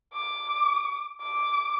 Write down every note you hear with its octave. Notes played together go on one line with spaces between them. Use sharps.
D6
D6